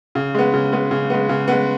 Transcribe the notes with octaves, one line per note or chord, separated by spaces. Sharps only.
C#3
G#3 B3
C#3
G#3 B3
C#3
G#3 B3
C#3
G#3 B3